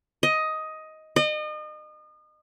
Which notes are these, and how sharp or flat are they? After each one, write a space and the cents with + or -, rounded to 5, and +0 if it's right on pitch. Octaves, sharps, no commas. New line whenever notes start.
D#5 +10
D#5 -35